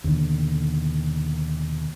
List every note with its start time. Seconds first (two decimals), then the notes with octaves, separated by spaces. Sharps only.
0.04 D#2 B2 D3